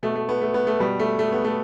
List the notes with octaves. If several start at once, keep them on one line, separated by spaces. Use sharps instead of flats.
B2 A3
A3
B3
A3
B3
A3
B2 G3
A3
A3
B3
A3